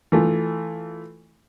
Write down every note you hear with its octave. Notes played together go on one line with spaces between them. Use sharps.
E3 A3 F4